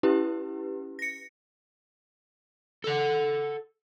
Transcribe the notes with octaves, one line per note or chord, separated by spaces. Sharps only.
C#4 E4 G4 B4
A#6 C#7
A4 F#5